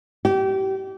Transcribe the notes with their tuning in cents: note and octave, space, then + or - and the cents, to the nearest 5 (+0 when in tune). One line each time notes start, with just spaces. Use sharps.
G4 -30